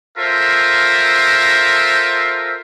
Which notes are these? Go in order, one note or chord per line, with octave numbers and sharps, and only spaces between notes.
F4 A4 A#4 C5 E5